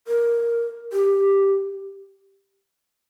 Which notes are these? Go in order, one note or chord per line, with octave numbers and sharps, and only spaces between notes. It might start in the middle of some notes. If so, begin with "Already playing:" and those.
A#4
G4